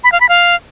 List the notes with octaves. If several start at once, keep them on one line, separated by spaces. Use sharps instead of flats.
B5
F5
B5
F5